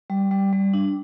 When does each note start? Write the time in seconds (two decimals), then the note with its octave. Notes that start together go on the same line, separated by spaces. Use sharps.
0.10 G3
0.31 G3
0.53 G3
0.73 D4